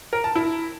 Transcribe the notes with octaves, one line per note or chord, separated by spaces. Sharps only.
A#4
A5
E4